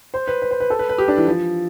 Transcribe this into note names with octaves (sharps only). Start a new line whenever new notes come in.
C5
B4
B4
C5
B4
A4
B4
B4
G4
D4
E3
F3